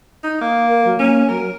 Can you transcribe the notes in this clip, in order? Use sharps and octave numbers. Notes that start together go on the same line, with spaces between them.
D#4
A#3
A#4
F#3
A#3 C#4
F#3 A#4